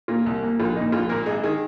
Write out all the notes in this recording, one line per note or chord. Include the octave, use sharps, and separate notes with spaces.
A#2 A#3 F4
C2
A#2 A#3
A#1 F4
A#2 A#3 D#4
A#1 F4
A#2 A#3 A#4
G#1 G#4
D#3 G#4